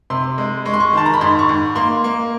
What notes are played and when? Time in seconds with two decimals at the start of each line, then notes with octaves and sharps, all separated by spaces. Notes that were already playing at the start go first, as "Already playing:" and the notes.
0.10 C3 C6
0.38 G#3
0.65 G#3 C#6
0.74 C6
0.80 C#6
0.93 D#3 A5
1.06 A#5
1.14 B5
1.21 G#2 C6
1.39 C#6
1.49 G#2
1.75 A#3 C6
2.04 A#3